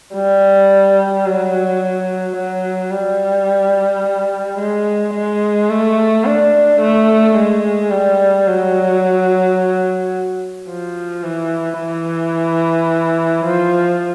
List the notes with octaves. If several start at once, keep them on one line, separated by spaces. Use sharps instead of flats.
G3
F#3
F#3
G3
G#3
G#3
A3
D4
A3
G#3
G3
F#3
F3
E3
E3
F3